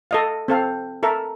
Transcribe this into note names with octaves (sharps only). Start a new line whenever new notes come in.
A4 D#5 F5
C4 A4 F5
A4 A#4 E5